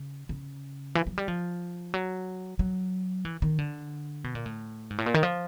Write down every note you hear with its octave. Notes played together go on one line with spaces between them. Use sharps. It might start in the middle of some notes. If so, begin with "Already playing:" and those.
Already playing: C#3
C#3
E3
F#3
G3
F3
F#3
F#3
E3
D#3
D3
B2
A#2
A2
G#2
A2
A#2
D#3
F3